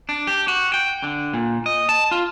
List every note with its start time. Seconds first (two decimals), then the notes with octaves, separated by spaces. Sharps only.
0.09 D4
0.27 G4
0.48 F#4
0.74 G5
1.03 D3
1.33 A#2
1.66 D#5
1.89 A5
2.11 F4